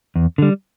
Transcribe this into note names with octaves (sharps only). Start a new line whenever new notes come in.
E2
D3 G3